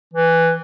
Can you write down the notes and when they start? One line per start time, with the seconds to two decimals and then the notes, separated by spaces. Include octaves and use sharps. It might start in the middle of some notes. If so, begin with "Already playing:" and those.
0.13 E3